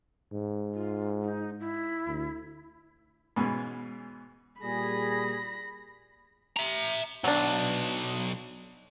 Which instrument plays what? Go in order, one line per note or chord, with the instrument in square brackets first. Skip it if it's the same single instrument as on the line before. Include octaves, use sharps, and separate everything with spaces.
[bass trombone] G#2
[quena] F4
D#4
E4
[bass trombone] D2
[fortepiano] G#2 B2 E3 C#4 G#5 B5
[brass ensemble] A#2 G3 G#4 [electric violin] B5 A#6
[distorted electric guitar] E5 A#5
[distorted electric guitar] B1 [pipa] F#3 D4